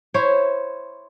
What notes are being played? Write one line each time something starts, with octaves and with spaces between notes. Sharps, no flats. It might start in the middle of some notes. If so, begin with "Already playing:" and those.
E4 C5 C#5